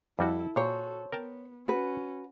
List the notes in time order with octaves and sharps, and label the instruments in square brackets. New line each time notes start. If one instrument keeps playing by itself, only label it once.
[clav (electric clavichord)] F2 G3 F#4 [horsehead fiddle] E4 A4
[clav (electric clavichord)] A#2 [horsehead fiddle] F#4 A4 [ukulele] C5 C#5
[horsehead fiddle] B3 [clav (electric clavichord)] A#4 G5 A5
[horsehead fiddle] C#4 [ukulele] F#4 B4